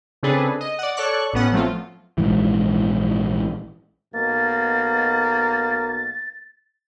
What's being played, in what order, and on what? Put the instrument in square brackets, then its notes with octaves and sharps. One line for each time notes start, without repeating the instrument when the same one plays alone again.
[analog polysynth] C#3 C4 D4 G#4 A4 B4
D#5
D5 F#5
A4 C#5 D5 C#6 F#6
A1 A2 B3 C#4 F#5
F3 F#3 A3 C4 F4
[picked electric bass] A#1 G#2 E3
[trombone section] B1 B2 A#3 [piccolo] A6